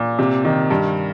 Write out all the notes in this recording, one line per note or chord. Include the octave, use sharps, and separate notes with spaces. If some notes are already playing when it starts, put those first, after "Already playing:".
Already playing: A#2
C3
D#3
G2